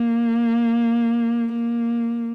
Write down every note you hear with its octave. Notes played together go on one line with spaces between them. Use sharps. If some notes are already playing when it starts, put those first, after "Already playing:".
Already playing: A#3
A#3